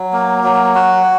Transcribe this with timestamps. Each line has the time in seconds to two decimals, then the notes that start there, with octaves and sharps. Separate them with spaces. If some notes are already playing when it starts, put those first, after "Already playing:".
Already playing: F#3
0.13 A#3
0.44 F#3
0.75 F#4